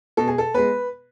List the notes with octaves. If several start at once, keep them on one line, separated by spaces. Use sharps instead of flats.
B2 A4
G#4
A4
G#3 B3 B4